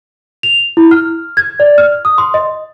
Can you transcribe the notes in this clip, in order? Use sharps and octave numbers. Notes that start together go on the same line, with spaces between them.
F7
E4
F6
G#6
D5
F6
D#6
C6
D#5